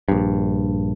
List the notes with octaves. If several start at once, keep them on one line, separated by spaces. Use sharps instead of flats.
A#1 G2